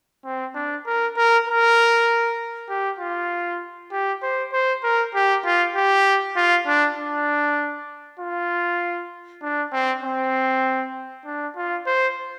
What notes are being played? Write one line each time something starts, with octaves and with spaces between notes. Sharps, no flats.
C4
D4
A#4
A#4
A#4
G4
F4
G4
C5
C5
A#4
G4
F4
G4
F4
D4
D4
F4
D4
C4
C4
D4
F4
C5